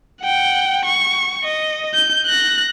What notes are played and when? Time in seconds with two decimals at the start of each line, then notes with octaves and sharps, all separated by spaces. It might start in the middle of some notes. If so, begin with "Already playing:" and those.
0.22 F#5 G5
0.85 C#6
1.44 D#5
1.94 G6
2.26 F#6 A#6